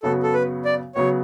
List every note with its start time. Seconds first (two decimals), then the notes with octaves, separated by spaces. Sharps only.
0.03 F#2 C#3 F#3 B3 F#4 A4
0.23 A4
0.33 B4
0.65 D5
0.95 C#3 F#3 B3 F#4 C#5